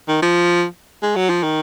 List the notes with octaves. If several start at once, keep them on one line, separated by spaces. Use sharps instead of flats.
D#3
F3
G#3
F#3
F3
D#3